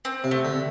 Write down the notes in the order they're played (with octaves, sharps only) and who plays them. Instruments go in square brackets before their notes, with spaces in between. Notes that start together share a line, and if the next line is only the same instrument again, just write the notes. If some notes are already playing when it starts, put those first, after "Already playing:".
[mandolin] C4
[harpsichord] C3
[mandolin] A3
[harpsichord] D3